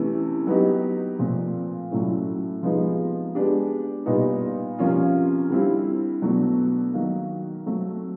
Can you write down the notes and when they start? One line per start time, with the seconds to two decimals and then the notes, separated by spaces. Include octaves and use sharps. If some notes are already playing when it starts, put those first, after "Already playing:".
Already playing: C3 E3 A3 C#4 E4
0.47 F#3 B3 D#4 G4
1.19 A#2 F3 A3 C4
1.91 A2 F#3 A3 C#4 E4
2.63 C3 F3 G#3 B3 D#4
3.35 G#3 B3 D4 G4
4.06 A#2 G3 B3 D#4
4.79 C3 F3 A#3 C#4 F4
5.50 D3 G3 C4 E4
6.22 B2 F#3 A3 D4
6.93 D#3 F#3 A#3
7.66 F#3 A3 C4